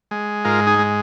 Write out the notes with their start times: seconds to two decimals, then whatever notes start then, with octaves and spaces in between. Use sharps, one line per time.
0.11 G#3
0.44 G#2 F4 A#4
0.67 D#4 G#4
0.79 G#3